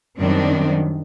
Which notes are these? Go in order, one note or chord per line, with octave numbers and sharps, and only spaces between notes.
F#2 D#3 G3 C4 D4